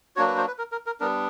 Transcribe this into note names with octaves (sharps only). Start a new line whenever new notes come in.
F#3 A#3 D4 F#4 C#5
B4
C5
B4
A#4
A#4
A#4
G3 B3 D4 A#4